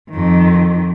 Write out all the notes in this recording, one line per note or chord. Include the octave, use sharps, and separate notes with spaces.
F2 D#3